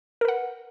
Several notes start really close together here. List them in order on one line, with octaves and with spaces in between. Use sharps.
A#4 B4 F#5